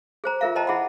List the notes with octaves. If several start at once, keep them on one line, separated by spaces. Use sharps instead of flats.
G#4 C5 A#5
F4 G#4 A#4 E5 F5
B4 C5 D#5 G5 A5 A#5
E4 G#4 F#5 B5